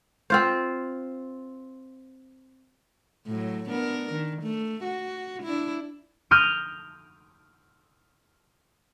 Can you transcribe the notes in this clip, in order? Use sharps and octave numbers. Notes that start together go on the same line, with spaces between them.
C4 F4 C5
A2 F#3
B3 D4 A#4
D#3
A3
F#4
D4 E4
D#6 F6 G6 A#6 D7 D#7